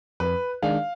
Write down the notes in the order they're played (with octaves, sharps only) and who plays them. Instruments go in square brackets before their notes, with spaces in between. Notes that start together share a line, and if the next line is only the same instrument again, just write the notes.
[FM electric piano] F2 [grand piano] B4
[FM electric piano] D#3 G#3 D4 [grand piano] F5